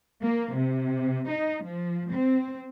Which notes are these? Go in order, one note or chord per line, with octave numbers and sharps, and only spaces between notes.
A#3
C3
D#4
F3
C4